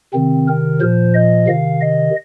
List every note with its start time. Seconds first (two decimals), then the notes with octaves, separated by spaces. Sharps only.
0.14 C3 D#3 C4
0.48 A#4
0.81 A#2 F3 C5
1.14 D#5
1.47 C3 D#3 F5
1.81 D#5